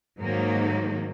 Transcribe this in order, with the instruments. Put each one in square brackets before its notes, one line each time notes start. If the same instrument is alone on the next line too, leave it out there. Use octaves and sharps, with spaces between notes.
[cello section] G#2 D#3 F#3 A#3